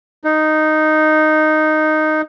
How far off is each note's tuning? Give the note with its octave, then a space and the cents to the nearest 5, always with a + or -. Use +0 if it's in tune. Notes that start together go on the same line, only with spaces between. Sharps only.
D#4 -5